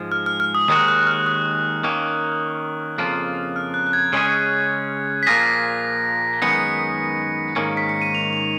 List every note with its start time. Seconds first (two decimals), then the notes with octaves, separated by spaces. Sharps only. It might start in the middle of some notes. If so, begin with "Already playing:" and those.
Already playing: G#2 F3 G#3
0.12 F6
0.26 F6
0.40 F6
0.55 D#6
0.68 D#2 D#3 G#3 D#4 F#4 D#6
0.88 F#6
1.07 F6
1.26 D#6
1.84 D#3 A#3 C#4
2.98 F2 C#3 F3 A#3 F4
3.56 F6
3.74 F#6
3.87 F#6
3.93 G#6
4.13 C#3 G#3 C#4 G#4
5.23 B6
5.27 A#2 F3 A#3 F4 G#4 A#6
6.42 F#2 D#3 G#3 B3 D#4 C#7
7.56 G#2 D#3 A#3 C#4
7.77 B6
7.89 C#7
8.02 D#7
8.15 F7
8.33 F7